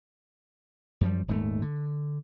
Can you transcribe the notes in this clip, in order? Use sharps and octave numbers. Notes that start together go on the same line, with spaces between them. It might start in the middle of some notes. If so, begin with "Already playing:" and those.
F#2 F3 G3
D#1 G#2 G3 A3
D3